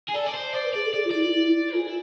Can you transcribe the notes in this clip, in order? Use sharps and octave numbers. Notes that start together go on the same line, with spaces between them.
G#4
A4 D5
D5
C5
C5 D5
B4
G#4 D5
A4
G#4 D5
F4
E4 D5
F4
E4
F4 G#4
E4